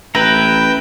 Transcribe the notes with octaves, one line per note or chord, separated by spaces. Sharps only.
A1 E4 B4 G5 A#5